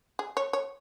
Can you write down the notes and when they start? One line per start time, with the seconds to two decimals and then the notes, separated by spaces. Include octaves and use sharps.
0.19 G#4
0.37 C#5
0.53 C#5